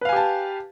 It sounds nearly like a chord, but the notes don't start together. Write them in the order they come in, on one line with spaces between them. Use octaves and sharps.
B4 F5 G#5 G4 A5